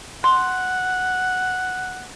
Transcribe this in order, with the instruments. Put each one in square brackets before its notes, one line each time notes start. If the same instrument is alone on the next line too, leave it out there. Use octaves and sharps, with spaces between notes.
[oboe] F#5 [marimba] C6